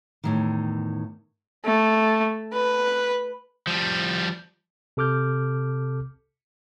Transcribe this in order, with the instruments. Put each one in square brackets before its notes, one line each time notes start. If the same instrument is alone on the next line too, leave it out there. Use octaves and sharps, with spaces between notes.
[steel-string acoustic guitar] E2 A2 D#3
[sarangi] A3
B4
[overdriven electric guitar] F3 G3
[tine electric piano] C3 A4 D6 F6 G6